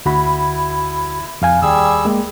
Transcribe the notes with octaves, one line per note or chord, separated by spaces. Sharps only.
D2 E4 F#4 B5
F2 F5 G#5
D#2 G3 G#4 E6
G#3 A#3